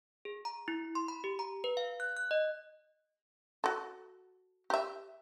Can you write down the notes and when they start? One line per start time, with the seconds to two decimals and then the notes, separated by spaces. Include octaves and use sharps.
0.25 G#4
0.45 A#5
0.68 E4
0.95 C6
1.08 B5
1.24 G4
1.39 A#5
1.64 B4
1.77 F5
2.00 F#6
2.17 F#6
2.31 D#5
3.64 F#4 A4
4.70 G4 E5